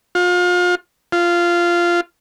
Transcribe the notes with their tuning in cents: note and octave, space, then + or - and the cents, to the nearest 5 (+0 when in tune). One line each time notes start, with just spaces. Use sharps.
F4 +35
F4 -10